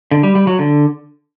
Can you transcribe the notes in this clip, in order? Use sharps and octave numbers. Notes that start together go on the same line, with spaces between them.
D3
G3
G3
F#3
D3